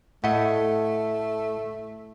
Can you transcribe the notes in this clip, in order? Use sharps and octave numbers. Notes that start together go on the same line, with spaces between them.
A2 A3 A4 D#5 E5 F#5